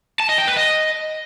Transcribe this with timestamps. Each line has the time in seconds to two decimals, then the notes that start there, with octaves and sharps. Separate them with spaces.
0.20 A5
0.29 D#5
0.38 G5
0.47 B4
0.57 D#5